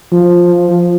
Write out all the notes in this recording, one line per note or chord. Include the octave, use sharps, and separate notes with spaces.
F3